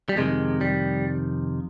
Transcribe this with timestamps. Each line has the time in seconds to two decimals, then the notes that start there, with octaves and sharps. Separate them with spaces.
0.09 G3
0.16 F2 C3 D#3 G#3
0.61 G3